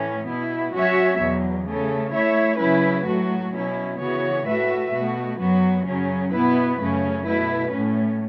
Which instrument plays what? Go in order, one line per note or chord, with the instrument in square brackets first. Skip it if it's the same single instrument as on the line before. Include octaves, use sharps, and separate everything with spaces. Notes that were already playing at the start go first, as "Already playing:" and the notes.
Already playing: [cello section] A2 E3 C#4
B2 B3 E4
F#3 C#4 F#4 C#5 E5
E2 B2 F#3
C#3 A3 C#4 A4
A3 E4 C#5 E5
C#3 F#3 C#4 E4 B4
A2 F#3 A3 F#4
B2 F#3 C#4 E4
C#3 E3 B3 F#4 C#5
A2 A3 F#4 B4 E5
B2 A3 F#4
F#2 F#3 B3 F#4
F#2 C#3 F#3 C#4
B2 B3 E4 B4
F#2 C#3 A3 C#4
B2 A3 E4 B4
A2 A3 C#4